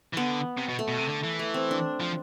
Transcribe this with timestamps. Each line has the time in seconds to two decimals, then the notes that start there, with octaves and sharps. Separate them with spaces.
0.13 E3
0.17 D3 B3
0.58 C3
0.69 B2
0.79 A3
0.88 B2
0.98 C3
1.09 D3
1.24 E3
1.39 A3
1.54 C4
1.71 D4
2.01 F3